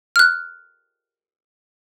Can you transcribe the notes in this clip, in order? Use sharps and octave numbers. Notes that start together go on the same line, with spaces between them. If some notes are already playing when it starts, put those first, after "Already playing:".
F6 F#6